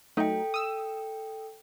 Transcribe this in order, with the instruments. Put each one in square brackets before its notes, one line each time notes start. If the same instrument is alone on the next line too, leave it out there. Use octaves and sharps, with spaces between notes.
[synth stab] F#3 A3 D#4 [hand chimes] A4 G5
[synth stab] D#6 E6